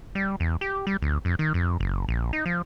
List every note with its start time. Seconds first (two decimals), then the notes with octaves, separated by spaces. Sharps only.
0.15 G3
0.40 E2
0.61 G4
0.87 G3
1.02 D2
1.25 F2
1.39 D#3
1.54 F2
1.80 F#1
2.09 A#1
2.33 D#4
2.46 F3